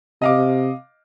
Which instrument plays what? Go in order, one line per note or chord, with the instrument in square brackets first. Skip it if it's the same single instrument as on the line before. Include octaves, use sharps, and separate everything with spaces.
[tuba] C3 [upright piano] D#5 F5 D6